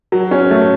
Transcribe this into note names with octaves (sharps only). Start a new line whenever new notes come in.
F#3
C#4
A3